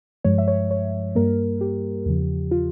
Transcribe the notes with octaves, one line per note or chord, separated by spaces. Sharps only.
G2 F3 G#3 C#5
E5
C#5
C#5
G2 G3 A#3 A#4
G4
E2 C#3 F3
F4